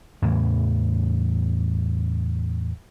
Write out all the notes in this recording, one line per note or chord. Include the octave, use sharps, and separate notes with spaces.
E2 A2 C#3 E3